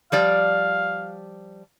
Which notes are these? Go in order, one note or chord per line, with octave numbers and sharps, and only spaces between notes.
F3 G3 D5 F5